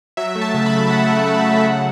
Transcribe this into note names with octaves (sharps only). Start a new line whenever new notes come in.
F#3 E5
A3
A5
C#3
B5
C#3
F#3 F#5
A3
C#3
C#3
F#3